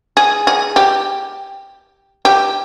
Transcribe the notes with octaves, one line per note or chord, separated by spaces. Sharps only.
G#4
G#4
G4
G4